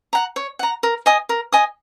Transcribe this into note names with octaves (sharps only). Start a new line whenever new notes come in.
F#5 A#5
C#5
F#5 A#5
A#4
D#5 G#5 D#6
A#4
D#5 G#5 D#6